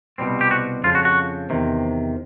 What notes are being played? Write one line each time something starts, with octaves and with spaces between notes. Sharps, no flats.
C2 B2 G3 C4
G4
F#4
F2 C#3 F3 F4
F#4
F#4
E2 C3 D#3